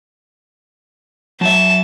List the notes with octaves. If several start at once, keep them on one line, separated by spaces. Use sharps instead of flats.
F#3 E5 A5